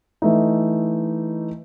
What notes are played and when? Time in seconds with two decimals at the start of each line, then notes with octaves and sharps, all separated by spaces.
0.22 E3 A3 D#4